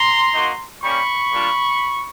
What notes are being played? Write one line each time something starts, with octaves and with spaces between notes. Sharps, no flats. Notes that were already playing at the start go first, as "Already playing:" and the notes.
Already playing: A#5 C6
A#3 D#4 F#4
G3 A#3 C#4 B5 C#6
G3 A#3 D4 F4